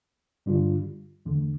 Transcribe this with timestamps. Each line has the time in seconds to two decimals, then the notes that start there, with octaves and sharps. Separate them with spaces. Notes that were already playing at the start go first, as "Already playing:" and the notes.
0.46 G2 D3 G3 D4 F4
1.25 E2 D3 A3